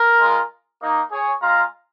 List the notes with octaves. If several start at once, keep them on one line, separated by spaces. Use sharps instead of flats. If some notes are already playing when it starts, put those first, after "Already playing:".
Already playing: A#4
G#3 F4
A#3 D#4
G#4 C#5
G#3 F4 F5 A#5